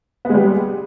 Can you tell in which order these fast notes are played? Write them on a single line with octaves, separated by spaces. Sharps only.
B3 G#3 G3